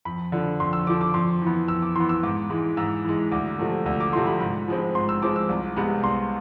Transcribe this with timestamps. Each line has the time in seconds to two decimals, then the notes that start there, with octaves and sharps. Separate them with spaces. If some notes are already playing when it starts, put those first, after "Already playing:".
0.05 F2 B5
0.32 D3 F3
0.60 F2 C6
0.73 E6
0.87 D3 F3 D6
1.01 D6
1.14 F2 C6
1.42 E3 B3
1.68 F2 E6
1.82 D6
1.96 E3 B3 C6
2.09 E6
2.23 G#2 D6
2.50 E3 G#3
2.77 G#2 E6
3.05 E3 G#3
3.31 D2 D6
3.59 C3 F3 A3
3.86 D2 E6
4.00 D6
4.13 C3 F3 A3 C6
4.27 B5
4.40 G#2 B5
4.68 F3 G#3 C4
4.95 G#2 C6
5.09 E6
5.22 F3 G#3 C4 D6
5.36 E6
5.49 C2 D6
5.76 C3 G#3 B3
6.04 C2 C6